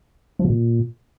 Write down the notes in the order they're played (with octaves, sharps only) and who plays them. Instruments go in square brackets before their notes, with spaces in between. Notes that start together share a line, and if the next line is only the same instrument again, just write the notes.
[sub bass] F3
B2
A#2